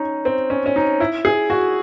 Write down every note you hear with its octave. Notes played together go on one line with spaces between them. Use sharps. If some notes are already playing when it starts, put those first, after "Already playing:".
Already playing: C#4 D#4
C4
C#4
C#4
D#4
E4
G#4
F#4